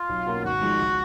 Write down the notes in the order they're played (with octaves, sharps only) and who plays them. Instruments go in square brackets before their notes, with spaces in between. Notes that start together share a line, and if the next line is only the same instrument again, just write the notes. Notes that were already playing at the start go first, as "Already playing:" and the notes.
Already playing: [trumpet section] F4
[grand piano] B1
B2 A#3 C#4
[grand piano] G#1 [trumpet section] F#4
[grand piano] G#2 F3 G#3
C#2